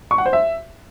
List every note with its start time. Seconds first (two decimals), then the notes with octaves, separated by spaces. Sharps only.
0.11 C#6
0.18 F#5
0.26 C5
0.33 E5